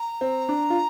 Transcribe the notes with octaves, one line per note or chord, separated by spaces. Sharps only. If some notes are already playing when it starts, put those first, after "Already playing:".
Already playing: A#5
C4
D4
F4